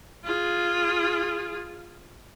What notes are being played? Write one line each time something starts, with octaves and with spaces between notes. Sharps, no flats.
F4 G#4